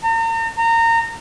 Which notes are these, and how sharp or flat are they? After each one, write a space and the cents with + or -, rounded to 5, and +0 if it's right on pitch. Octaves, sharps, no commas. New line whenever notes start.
A#5 -40
A#5 -25